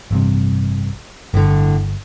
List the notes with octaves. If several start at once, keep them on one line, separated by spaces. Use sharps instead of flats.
A1 G2 C3
G1 A2 D3